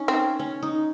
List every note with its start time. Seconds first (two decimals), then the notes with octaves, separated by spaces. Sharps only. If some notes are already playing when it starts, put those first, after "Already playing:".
Already playing: C#4 D#4
0.08 C4
0.40 C#4
0.63 D#4